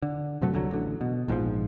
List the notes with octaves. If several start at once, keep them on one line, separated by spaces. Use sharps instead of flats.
D3
F#2 C3 F#3 A3
C2 D3 F#3
A1 D3
B2
A#1 G#2 D#3 F3